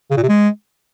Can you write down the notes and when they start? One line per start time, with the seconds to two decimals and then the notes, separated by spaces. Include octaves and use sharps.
0.11 C#3
0.17 A#2
0.23 C3
0.29 G#3